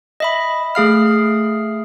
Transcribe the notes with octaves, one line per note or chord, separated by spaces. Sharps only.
D#5 E5 B5
A3 G#4 F5 F6